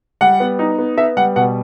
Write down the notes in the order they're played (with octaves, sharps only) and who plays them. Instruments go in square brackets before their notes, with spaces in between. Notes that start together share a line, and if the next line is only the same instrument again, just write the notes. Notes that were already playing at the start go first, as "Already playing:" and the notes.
[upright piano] G3 F#5
B3
D#4
B3
B3 E5
G3 F#5
B2 F#5